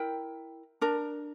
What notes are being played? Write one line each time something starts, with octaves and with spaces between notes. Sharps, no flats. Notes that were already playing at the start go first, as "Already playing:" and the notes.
Already playing: E4 A#4 G5
D4 A#4